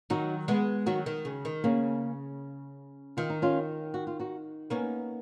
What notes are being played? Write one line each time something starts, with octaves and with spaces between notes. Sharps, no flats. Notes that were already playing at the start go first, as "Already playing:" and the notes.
D#3 F#3 D#4 F#4
G#3 B3
D#3 F#3 D#4 F#4
D#3
C#3
D#3
C#3 A#3 C#4
D#3 F4
D#4
C#4 F4
F#4
F4
D#4 F#4
A#3 B3 C#4 D#4